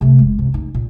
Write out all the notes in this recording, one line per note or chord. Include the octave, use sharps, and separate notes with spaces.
C3 A3
F1 G#3
C3
F1 D#4
A#2